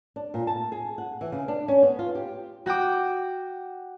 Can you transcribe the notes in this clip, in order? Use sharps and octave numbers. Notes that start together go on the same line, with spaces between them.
D4
A#2
A5
G#4
F#5
E3
C#3
D4
C#4
B3
F4
G4
F#4 F#5 G5 D6